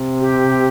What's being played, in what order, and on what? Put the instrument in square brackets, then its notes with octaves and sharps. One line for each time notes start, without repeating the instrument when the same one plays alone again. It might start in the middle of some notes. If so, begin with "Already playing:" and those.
Already playing: [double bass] C3
[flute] G4